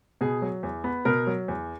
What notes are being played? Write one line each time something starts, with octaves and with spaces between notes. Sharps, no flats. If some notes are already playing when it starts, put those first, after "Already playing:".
B2 G#4
F#3
E2
B3
B2 A#4
F#3
E2